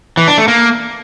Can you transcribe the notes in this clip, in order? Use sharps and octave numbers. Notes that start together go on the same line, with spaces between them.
E3
D4
A3
A#3